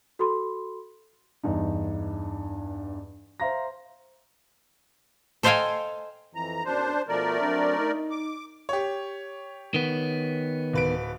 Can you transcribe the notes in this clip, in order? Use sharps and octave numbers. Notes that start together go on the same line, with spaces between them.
F#4 A4 B5 C6
E2 G2 D#4
C5 E5 F5 A#5 C6 A#6
A4 C5 D#5 F5 G5 G#5
F2 E3 A#5
B1 F#2 D4 C5
B2 F3 A3 A#4 D5
F#3 C4 D4
D#4
D6
G4 C#5
D#3 B3
D1 B4 D7